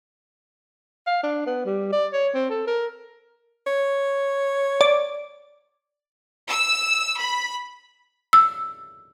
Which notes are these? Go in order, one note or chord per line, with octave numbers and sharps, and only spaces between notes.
F5
D4
B3
G3
D5
C#5
C4
A4
A#4
C#5
D5
E6
B5
E6